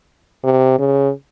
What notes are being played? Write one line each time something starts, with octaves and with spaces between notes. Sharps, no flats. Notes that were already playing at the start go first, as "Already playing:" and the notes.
C3
C#3